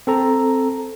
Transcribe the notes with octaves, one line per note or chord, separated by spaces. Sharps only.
C4 A4 A#5